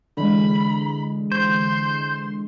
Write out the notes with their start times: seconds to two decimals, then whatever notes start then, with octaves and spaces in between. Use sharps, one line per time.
0.17 D3 E3 G#3 B5
1.32 C5 C6 G6